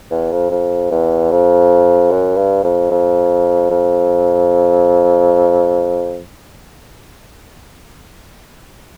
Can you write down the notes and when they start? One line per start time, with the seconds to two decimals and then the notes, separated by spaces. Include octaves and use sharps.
0.11 E2
0.31 F2
0.51 F2
0.91 E2
1.31 F2
2.11 F#2
2.37 G2
2.64 F2
2.91 F2
3.70 F2